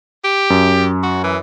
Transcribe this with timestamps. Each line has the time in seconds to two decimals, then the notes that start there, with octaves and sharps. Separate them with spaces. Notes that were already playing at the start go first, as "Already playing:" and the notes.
0.24 G4
0.50 F#2
1.03 F#4
1.24 E3